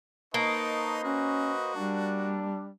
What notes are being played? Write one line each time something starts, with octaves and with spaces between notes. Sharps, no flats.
A#3 D#4 B4 C5 D#5 A5 C#6
C#4 F#4
G3 D4